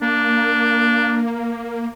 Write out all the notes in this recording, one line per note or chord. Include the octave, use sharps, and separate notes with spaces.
A#3 D4